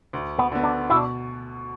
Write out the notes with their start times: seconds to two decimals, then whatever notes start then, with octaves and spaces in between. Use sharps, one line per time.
0.13 D2
0.39 B3
0.52 D3 B3
0.63 D4
0.90 B2 E4
0.96 D4